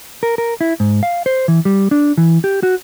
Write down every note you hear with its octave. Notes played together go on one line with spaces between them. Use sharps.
A#4
A#4
E4
G#2
F5
C5
E3
G3
D4
E3
G4
F#4